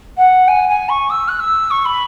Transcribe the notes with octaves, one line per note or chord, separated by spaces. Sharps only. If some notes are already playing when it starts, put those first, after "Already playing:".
F#5
G#5
G#5
C#6
E6
F#6
E6
C#6
B5